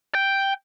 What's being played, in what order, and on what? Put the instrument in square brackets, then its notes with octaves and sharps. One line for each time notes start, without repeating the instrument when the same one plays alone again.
[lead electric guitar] G5